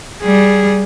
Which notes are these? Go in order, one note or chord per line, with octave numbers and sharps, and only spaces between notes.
G3 G#4